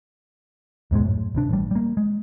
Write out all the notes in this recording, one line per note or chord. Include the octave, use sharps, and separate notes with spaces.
D#2 G#2 B2 G#3
F#2 A2
D1 C3 D4
A1 G3
G3 A#3
G#3